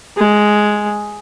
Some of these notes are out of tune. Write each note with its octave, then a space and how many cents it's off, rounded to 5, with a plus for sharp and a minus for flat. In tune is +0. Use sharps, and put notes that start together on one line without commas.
G#3 +5